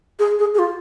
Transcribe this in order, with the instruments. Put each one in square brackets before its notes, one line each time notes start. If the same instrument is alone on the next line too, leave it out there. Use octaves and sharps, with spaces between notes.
[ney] G#4
G#4
G#4
F4